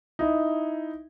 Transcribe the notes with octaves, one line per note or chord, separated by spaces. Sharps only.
D#4 E4